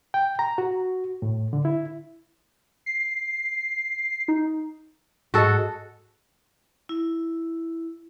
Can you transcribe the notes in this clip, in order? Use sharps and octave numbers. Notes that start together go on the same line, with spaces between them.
G5
A#5
F#4
A2
D3
E4
C7
D#4
G#2 F#4 G#4 A4 D#5
E4